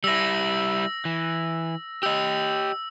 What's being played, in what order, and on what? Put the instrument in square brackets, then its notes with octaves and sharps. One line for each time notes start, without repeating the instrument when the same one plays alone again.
[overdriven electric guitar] G3 E4 [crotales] E6 A#6
[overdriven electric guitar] E3
[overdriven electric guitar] G4 D#5 [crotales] E6